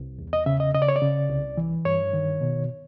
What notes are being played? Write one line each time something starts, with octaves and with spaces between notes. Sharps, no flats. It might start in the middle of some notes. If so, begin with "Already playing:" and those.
Already playing: C2
E2
D#5
C#3 E5
D#5
C#3 D#5
D5
C#5
D5
C#3
C2
E3
G2 C#5
D#3
B2